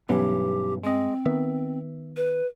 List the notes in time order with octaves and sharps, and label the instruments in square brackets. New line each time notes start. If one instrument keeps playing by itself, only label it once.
[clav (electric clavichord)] B1 E3 [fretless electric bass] G2 B3 C#4 [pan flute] G4
[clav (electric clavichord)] G#3 D#5 [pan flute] C4
[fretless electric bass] D#3 B3 [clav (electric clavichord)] E5
[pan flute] B4